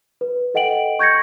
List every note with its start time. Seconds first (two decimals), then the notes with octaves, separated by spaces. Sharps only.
0.21 B4
0.54 A4 D#5 F#5 G5 D7 F#7
0.99 C#6 G6 G#6 A#6 C#7